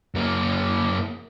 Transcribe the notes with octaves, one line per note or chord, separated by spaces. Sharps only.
F#2 A#3